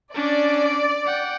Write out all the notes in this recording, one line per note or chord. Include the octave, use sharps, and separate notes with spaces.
C#4 D4 D5
F#5 G5